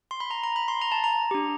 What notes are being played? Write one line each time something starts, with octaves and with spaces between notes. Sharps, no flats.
C6
B5
A#5
A#5
B5
C6
A#5
A5
A#5
D4 G4